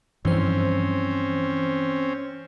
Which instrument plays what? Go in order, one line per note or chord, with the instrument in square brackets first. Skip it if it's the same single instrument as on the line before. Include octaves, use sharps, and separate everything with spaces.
[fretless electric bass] G2 F3 [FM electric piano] E3 C5 [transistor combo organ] C4 C#4